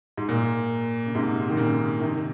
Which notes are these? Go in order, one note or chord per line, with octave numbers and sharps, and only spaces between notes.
G#2
A#2
C#3
G#2 C3
D#3
A#2 C#3
C3 D#3